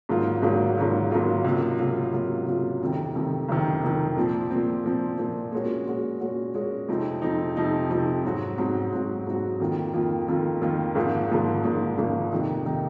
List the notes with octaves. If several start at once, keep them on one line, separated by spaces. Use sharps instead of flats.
G#1 G#2 F#3 A#3 F4
G#1 G#2 F#3 A#3 F4
G#1 G#2 F#3 A#3 F4
G#1 G#2 F#3 A#3 F4
C#2 C3 F#3 A#3 F4
C#2 C3 F#3 A#3 F4
C#2 C3 F#3 A#3 F4
C#2 C3 F#3 A#3 F4
F#1 F2 C3 D#3
F#1 F2 C3 D#3
F#1 F2 C3 D#3
F#1 F2 C3 D#3
A#2 F3 C4
A#2 F3 C4
A#2 F3 C4
A#2 F3 C4
A#2 G#3 C#4 F#4
A#2 G#3 C#4 F#4
A#2 G#3 C#4 F#4
A#2 G#3 C#4 F#4
F2 C3 F3 C4 D#4
F2 C3 F3 C4 D#4
F2 C3 F3 C4 D#4
F2 C3 F3 C4 D#4
G#2 F#3 C4 F#4
G#2 F#3 C4 F#4
G#2 F#3 C4 F#4
G#2 F#3 C4 F#4
F2 D#3 A#3 F4
F2 D#3 A#3 F4
F2 D#3 A#3 F4
F2 D#3 A#3 F4
G#1 G#2 F3 A#3
G#1 G#2 F3 A#3
G#1 G#2 F3 A#3
G#1 G#2 F3 A#3
F2 C3 D#3 A#3 D#4
C3 D#3 A#3 D#4